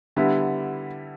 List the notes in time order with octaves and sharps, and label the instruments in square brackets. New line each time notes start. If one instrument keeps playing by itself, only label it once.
[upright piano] D3 G3 B3 E4